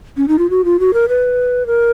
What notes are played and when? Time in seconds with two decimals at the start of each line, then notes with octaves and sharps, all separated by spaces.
0.17 C#4
0.28 D#4
0.39 F4
0.50 F#4
0.65 F4
0.80 F#4
0.94 A#4
1.09 B4
1.66 A#4